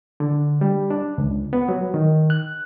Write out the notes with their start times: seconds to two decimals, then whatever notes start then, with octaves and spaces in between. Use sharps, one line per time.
0.20 D3
0.61 G3
0.90 D4
1.18 C#2
1.53 B3
1.69 F#3
1.94 D#3
2.30 F#6